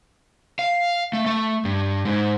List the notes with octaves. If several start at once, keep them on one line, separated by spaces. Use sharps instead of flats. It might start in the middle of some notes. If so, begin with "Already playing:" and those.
F5
A3
A3
G2
G#2